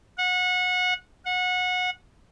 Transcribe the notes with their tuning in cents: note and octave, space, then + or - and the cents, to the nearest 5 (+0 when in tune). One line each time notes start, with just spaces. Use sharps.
F#5 -25
F#5 -25